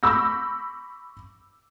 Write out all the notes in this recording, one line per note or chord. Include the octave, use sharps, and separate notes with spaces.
B5 C#6 D6 E6 G6 A#6